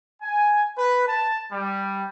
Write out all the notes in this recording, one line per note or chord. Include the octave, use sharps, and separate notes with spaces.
G#5
B4
A5
G3